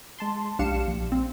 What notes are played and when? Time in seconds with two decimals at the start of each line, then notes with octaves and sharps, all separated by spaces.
0.19 G#3 A5 C6
0.59 B1 D4 G4 F5 C#7 E7
0.88 A#1
1.12 C4